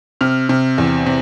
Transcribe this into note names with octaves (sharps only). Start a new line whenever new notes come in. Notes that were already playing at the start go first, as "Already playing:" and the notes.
C3 F6
C3
E2
C3